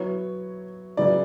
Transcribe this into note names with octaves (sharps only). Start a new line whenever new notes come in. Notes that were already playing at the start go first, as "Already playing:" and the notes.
Already playing: F#3 B3 E4 C#5
C#3 F#3 B3 E4 D5